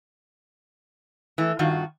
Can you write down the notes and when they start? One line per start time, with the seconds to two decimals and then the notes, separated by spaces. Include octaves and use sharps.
1.38 E3 A3
1.59 G2 D#3 F4 F#4